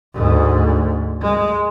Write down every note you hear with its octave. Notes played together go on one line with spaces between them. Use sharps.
D2 G#2
G#3